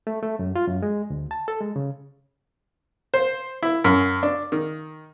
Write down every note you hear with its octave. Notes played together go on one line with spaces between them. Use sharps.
A3
A3
F#2
F4
F#2
G#3
D2
A5
A4
G#3
C#3
C5
E4
F#2
D4
D#3